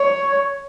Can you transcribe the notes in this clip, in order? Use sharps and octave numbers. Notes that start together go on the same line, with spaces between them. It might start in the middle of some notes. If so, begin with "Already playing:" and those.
Already playing: C#5